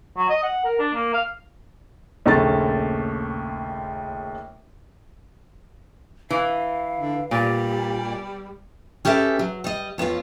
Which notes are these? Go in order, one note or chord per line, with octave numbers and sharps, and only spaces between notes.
F#3
D#5
F#5
A#4
D4
A#3
F5
A#1 D#2 C#3 A3 A#5 A6
E3 F5
D3
A#2 G3 G4
C#4 G4 A4 B4 E5
F#3
G3 D#5
F2 B3 C#4 F4